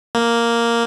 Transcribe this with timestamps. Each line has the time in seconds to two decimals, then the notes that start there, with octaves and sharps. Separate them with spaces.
0.15 A#3